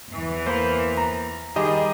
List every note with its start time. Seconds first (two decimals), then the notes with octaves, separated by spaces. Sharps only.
0.11 E2 E3
0.47 A#3 B4 C5
0.97 A#5
1.56 D#3 G3 G4 G#4 D#5